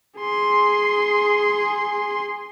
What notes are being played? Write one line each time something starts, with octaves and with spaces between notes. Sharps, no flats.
G#4 C6